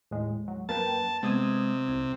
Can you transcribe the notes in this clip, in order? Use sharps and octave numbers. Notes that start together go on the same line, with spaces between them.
D#2 A2 G#3
F#3
F#2 A#3 B4 G5 A5
C3 G#3 B3 D#6 G#6
C2